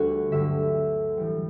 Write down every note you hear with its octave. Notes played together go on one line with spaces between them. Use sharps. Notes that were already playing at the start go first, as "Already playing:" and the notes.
Already playing: D2 D3 G3 F#4
G2 D3 F#3 E5
A2 E3 G3